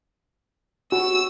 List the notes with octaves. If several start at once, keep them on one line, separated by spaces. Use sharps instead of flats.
F#4 E6